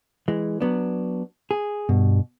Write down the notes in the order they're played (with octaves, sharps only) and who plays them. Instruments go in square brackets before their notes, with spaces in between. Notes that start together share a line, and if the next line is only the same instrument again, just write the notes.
[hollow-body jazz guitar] E3 G#3
F#3 B3 D4
G#4
[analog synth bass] G2 [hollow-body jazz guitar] B2